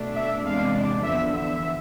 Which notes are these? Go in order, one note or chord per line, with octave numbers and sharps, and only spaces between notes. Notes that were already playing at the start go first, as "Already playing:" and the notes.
Already playing: B2 A3 D4
E5
E2 C3 G#3 D4 F5
D5
E2 D3 F3 E5
E5